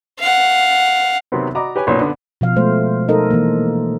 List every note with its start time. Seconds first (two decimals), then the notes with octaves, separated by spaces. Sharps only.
0.19 F5 F#5
1.32 C3 D#3 F#3 B3 C4
1.55 F#4 D5 D#5 A#5 B5 D6
1.76 G4 B4 C#5 G#5
1.87 B1 A#2 C#4 C#5
2.00 D3 B3
2.41 B2 F3 F5
2.56 G#3 A3 C5
3.09 D#4 A4 A#4 D#5
3.31 E3 A#3